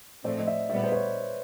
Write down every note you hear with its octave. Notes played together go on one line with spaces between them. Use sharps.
A2 F3 A3 C4 C5 D5
D#5
D5 E5
A#2 G3 B3 D5 E5
C5
B4 C#5